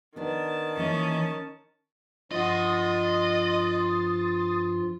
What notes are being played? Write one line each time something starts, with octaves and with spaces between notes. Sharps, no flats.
D#3 B3 D4 A5
E3 A#3 C#4 D#5
G2 F3 F4 D#5 F#5 C6 D#6 A6